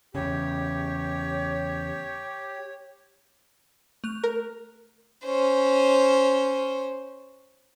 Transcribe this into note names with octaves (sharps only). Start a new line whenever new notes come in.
E2 C#3 G4 C#5
A3 F#6 F7
A#4
C#4 C5